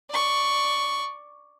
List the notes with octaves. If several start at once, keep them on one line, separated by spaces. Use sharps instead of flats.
D5 C#6